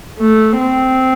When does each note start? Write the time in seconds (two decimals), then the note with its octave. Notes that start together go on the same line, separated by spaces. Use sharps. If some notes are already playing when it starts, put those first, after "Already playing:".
0.19 A3
0.60 C4